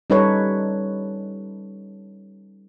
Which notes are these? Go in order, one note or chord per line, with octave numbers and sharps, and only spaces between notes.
G3 C#4 D#4 A4 B4 C#5